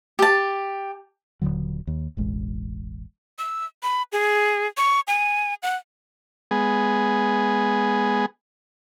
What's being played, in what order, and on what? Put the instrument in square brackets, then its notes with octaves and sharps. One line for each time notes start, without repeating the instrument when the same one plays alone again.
[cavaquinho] G4 A5
[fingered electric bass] D#1 A#1 D3 F#3
D#2
E1 A1 G#3
[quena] E6
B5
G#4
C#6
G#5
F#5
[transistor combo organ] G#3 B3 G#4